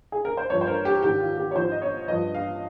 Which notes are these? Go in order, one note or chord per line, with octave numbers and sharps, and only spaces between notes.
G#4
A#4
C5
G2 F3 C#5
C5
A#4
G4
G#2 D#3 G4
F4
G4
C#5
G#2 F3 C5
D#5
C#5
G2 F3 D#5
F5